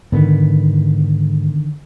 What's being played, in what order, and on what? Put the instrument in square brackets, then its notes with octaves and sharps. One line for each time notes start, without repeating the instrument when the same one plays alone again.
[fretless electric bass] G#2 B3 [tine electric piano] D3 D#3